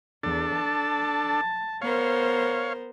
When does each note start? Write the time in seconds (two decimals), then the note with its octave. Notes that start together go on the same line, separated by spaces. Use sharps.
0.23 E2 D4 A4
0.54 A5
1.82 B3 A#4 C5 C#5 F5